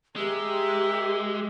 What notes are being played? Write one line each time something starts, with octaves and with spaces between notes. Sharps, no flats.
G#3 G4 A#4 E5